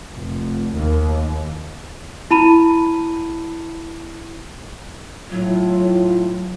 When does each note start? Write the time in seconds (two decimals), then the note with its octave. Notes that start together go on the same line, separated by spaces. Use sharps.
0.14 F1
0.73 D#2
2.31 E4 A5 B5 D#7
5.31 A2 F#3 F4